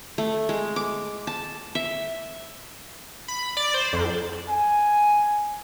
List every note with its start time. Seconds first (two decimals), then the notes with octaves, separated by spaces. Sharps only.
0.18 A3
0.49 G#3
0.76 D6
1.27 A5
1.75 E5
3.28 B5
3.57 D5
3.74 C5
3.93 F2
4.49 G#5